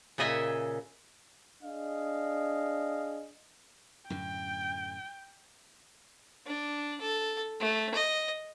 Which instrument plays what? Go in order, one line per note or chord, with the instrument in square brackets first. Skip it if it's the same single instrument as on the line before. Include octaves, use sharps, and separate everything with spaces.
[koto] A#2 C#3 D#5 E5 G#5
[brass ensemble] D4 G#4 D#5 F5
[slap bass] F#2 A2 D3 [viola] G5
[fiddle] D4
A4
A3
D#5